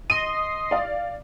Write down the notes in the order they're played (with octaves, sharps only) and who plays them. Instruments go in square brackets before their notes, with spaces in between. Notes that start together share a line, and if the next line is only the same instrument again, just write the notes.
[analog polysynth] D#5 C6 [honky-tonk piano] D#7
[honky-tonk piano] D5 F5